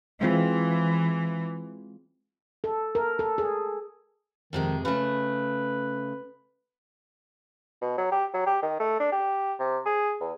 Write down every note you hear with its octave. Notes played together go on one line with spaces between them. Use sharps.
E3 G#3 C4 F4
A4
A#4
A4
G#4
F2 C3 D#3 G#3
C#3 A3 B4
B2
F#3
G4
F#3
G4
D#3
A3
D4
G4
C3
G#4
E2